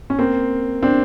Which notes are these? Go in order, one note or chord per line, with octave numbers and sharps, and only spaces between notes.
C#4
A#3 C4
C4 D4